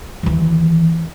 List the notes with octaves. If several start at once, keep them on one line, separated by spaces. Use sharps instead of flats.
D#2 E3